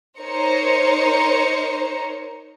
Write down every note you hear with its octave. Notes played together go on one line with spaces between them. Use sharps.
D#4 A#4 C5 C#5 C#7